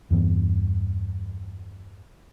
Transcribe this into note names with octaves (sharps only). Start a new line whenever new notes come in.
E2 G2 E3 B3